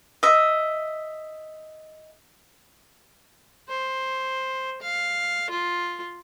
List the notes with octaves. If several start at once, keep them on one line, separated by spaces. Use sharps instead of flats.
D#5 E5
C5
F5
F4